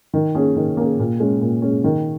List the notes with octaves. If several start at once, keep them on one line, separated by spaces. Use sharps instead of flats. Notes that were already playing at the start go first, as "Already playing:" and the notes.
D#3
A#3 C#4 G#4
D#3
A#3 C#4 G#4
A#2
G#3 C#4 G#4
A#2
G#3 C#4 G#4
D#3